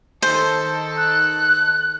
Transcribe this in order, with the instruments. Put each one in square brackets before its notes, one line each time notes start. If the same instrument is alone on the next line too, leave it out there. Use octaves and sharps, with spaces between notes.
[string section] D#3 A4 [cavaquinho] C5
[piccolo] F#6